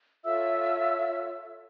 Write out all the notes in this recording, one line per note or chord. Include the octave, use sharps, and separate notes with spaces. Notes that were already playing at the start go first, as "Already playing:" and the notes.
F4 A4 C#5 E5 E6